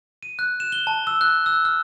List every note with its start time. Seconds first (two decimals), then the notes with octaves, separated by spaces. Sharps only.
0.23 D#7
0.39 F#6
0.60 E7
0.72 G7
0.87 A5
1.07 E6
1.21 F#6
1.46 E6
1.65 F6